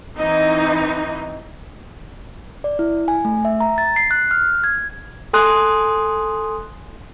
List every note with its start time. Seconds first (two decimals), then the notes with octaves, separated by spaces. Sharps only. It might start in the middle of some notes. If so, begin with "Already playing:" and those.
0.17 E3 C4 D#4
2.64 D5
2.79 E4
3.08 G#5
3.25 A3
3.45 E5
3.61 A#5
3.78 A6
3.96 C7
4.11 F#6
4.31 F6
4.64 G#6
5.33 A4 G#5 C6 D#6 F#6